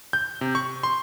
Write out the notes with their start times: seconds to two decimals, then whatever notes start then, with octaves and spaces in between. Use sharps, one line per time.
0.13 G6
0.41 C3
0.55 C#6
0.83 C6